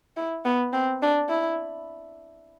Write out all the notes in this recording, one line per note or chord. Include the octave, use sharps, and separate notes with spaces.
E4
B3
C4
D4
E4